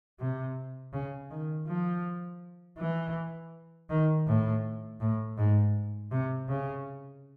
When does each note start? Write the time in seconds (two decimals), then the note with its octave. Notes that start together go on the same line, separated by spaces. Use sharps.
0.20 C3
0.93 C#3
1.30 D#3
1.67 F3
2.78 E3
3.89 D#3
4.27 A2
5.00 A2
5.38 G#2
6.11 C3
6.48 C#3